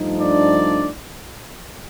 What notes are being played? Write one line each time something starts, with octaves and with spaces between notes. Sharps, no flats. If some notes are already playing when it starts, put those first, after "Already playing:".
Already playing: G2 F3 A3 D#4
D4 D5